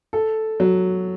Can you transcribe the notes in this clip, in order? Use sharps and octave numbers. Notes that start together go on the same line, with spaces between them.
A4
F#3